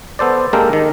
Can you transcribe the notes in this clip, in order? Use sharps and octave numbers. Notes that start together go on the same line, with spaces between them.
B3 A4 C5 D5
G#3 A#3 D4 G4 A4 A#4
D#3